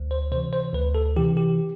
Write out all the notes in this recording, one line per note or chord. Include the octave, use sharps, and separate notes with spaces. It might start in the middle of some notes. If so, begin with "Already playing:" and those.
Already playing: D2
C5
C3 E3 C5
C5
D2 B4
A4
C3 E3 G4
G4